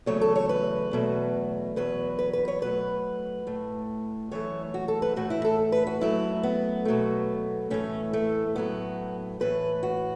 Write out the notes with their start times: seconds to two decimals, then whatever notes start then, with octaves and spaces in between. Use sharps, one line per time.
0.06 E2 C#3 F#3 A3 C#5
0.21 A4
0.36 C#5
0.49 B4
0.91 E2 B2 F#3 A3
1.76 E2 B2 F#3 B4
2.19 B4
2.33 B4
2.48 C#5
2.62 B2 F#3 A3 B4
3.47 A2 A3
4.31 F#2 E3 A3 C#5
4.74 F#4
4.88 A4
5.02 B4
5.16 A2 E3 A3 F#4
5.30 E4
5.45 A4
5.72 B4
5.87 F#4
6.01 F#2 F#3 A3 E4
6.43 B3
6.85 B2 F#3 A3
7.70 A2 E3 A3 C#4
8.13 A3
8.56 A2 F#3 A3 B3
9.40 A2 E3 A3 B4
9.83 F#4